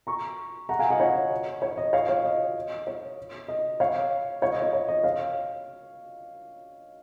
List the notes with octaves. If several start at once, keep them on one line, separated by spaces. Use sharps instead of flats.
A#5 C#6
F#5 A#5
F5 G#5
D#5 F#5
C#5
C#5
D#5
C#5 F5
C#5 F5
D#5
C#5
D#5
C#5 F5
C#5 F5
D#5
C#5
C#5
D#5
C#5 F5